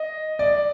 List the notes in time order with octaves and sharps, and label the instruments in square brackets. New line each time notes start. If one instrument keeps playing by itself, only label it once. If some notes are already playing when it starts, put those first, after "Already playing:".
Already playing: [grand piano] D#5
D5